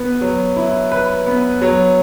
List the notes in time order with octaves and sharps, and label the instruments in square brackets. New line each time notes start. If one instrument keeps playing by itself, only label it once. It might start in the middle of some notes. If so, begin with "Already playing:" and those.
Already playing: [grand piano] B3 B4
F#3
E4
B4
B3
F#3